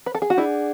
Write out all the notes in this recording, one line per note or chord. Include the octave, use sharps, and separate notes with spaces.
B4
A4
G#4
F#4
D4 E4 G#4 D5 F#5